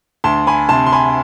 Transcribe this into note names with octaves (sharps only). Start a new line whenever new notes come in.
D2 A5 C6
G#5 B5
C3 A5 C6
C6
G#5 B5